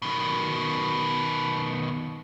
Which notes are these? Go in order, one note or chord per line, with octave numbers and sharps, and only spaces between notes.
B2 D#3